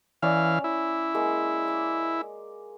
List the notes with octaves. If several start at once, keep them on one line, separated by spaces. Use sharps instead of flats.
E3 C#4 D5 F5
E4
G#3 A#3
D6